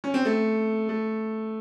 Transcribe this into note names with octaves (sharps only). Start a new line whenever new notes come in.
C#4
C4
A3
A3